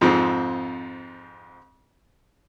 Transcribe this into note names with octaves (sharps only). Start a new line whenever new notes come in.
F2 G#2 F3 C4